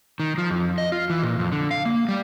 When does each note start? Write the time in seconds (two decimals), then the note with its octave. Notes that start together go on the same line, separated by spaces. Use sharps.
0.20 D#3
0.38 F3
0.51 F2
0.78 D#5
0.92 F4
1.10 E3
1.23 A#2
1.39 F2
1.52 D3
1.71 F5
1.85 A#3
2.09 G3